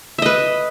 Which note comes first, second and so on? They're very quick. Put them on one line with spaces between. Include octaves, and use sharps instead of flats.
E5 D#5 B4